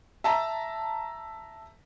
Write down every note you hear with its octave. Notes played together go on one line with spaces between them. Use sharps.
E5 A5 A#5